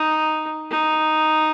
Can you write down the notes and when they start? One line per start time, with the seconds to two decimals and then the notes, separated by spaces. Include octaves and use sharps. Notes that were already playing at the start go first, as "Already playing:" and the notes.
Already playing: D#4
0.71 D#4